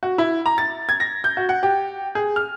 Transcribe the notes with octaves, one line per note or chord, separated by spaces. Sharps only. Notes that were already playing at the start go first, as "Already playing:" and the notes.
F#4
E4
A#5
A6
G#6
A#6
G6
F#4
F#5
G4
G#4
F6